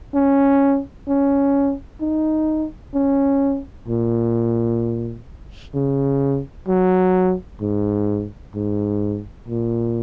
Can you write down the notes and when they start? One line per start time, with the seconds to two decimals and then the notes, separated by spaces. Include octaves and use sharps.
0.15 C#4
1.08 C#4
2.01 D#4
2.95 C#4
3.88 A#2
5.74 C#3
6.68 F#3
7.61 G#2
8.55 G#2
9.48 A#2